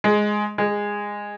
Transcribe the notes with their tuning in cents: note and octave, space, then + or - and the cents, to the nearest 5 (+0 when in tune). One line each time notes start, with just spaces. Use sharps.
G#3 +5
G#3 -15